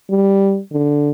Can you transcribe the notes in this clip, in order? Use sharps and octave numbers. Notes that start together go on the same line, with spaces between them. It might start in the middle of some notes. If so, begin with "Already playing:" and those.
G3
D3